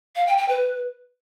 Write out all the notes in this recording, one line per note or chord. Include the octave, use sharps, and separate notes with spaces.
F5
G5
G5
B4